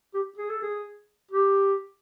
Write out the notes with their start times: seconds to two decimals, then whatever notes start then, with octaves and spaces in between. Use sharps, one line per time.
0.14 G4
0.37 G#4
0.50 A4
0.62 G#4
1.31 G4